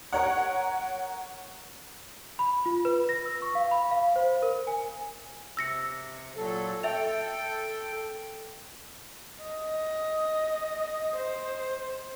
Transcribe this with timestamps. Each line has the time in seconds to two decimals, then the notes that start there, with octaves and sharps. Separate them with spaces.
0.13 A#4 C#5 F#5
2.39 B5
2.66 F4
2.85 B4
3.09 A#6
3.25 E6
3.42 C#6
3.55 F5
3.71 B5
3.91 F5
4.16 C5
4.42 A#4
4.67 G#5
5.57 C3 E6 A#6 C#7
6.37 A#2 F#3 A4
6.83 A4 E5 G5 F7
9.44 D#5
11.17 C5